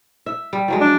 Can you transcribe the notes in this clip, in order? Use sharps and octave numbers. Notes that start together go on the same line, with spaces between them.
E5
G3
F3 F#3 G#3
D4